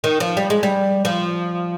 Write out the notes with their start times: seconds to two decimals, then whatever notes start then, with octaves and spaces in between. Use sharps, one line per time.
0.04 D#3
0.20 F3
0.37 G3
0.50 G#3
0.63 G3
1.05 F3